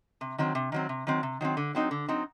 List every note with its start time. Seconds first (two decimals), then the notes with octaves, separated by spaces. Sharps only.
0.21 C3
0.38 D#3 F#3 C4
0.55 C3
0.72 D#3 F#3 C4
0.89 C3
1.07 D#3 F#3 C4
1.23 C3
1.41 D#3 F#3 C4
1.57 D3
1.75 F#3 C4 D#4
1.91 D3
2.08 F#3 C4 D#4